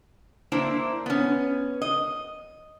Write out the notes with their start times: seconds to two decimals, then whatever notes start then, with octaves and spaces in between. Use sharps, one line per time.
0.52 A#3 D4 E4 C5
1.06 B3 C#4
1.82 D#5